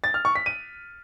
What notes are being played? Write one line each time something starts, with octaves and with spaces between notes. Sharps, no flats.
A6
F6
C#6
B6
D#7